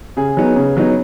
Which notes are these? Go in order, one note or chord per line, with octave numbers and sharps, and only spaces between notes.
C#3 G#4
F#3 B3 D#4
C#3
F#3 B3 D#4